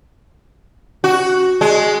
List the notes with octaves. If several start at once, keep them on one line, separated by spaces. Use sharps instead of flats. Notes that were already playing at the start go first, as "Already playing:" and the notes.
F#4
G#3